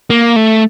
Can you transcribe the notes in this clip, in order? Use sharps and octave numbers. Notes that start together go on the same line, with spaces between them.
A#3
A3